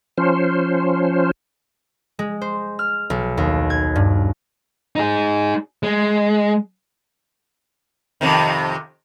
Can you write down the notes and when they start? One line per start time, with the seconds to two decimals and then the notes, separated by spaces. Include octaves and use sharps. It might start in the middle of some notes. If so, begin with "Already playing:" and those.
0.18 F3 C#4 C5
2.19 G#3
2.41 C5
2.79 F6
3.10 B1
3.37 D#2
3.70 G#6
3.96 G2
4.96 D#4 G#4
5.83 G#3
8.21 F2 C3 D#3